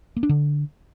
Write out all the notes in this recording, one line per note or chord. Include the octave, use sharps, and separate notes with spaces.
A#3
D4
D3